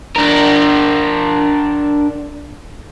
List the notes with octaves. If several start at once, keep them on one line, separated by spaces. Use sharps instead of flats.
D4 A#4